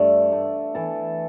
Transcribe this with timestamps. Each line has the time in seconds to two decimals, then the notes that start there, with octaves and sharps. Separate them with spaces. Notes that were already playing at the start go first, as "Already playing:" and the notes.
Already playing: G2 A3
0.32 A3
0.75 E3 A4